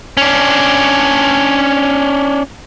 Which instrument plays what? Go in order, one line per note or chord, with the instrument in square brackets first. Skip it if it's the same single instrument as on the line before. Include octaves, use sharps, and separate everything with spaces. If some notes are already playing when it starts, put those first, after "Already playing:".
[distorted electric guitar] C#4 D4